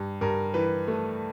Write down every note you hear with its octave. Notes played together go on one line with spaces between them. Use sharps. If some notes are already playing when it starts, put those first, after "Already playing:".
Already playing: G2
G2 A#4
E3 B4
A3